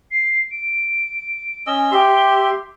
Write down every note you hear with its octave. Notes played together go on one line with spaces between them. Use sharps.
C7
D7
C#4 D#5 E6 G7
G4 E5 C6